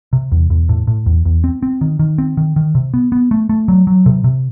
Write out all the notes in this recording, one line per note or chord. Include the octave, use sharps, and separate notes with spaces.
C3
E2
E2
A2
A2
E2
E2
C4
C4
D#3
D#3
C4
D#3
D#3
C3
B3
B3
A3
A3
F#3
F#3
C3
C3